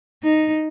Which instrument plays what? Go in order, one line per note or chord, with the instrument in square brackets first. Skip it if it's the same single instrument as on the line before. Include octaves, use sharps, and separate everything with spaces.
[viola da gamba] D#4